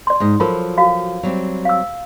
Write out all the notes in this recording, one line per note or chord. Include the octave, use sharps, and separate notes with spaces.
D5 C6
G#2 D#5
F3 F#3 F4 A4 A#4
F#4 F5
F#3 G3 C4
F5 E6